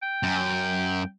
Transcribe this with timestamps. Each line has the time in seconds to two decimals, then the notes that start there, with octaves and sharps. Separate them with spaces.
0.02 G5
0.23 F#2